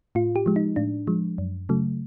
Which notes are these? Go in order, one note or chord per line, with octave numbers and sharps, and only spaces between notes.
A2 F4
G4
F3 G#3
D#4
A2 D4
F3 G#3
F#2
C#3 F#3 A3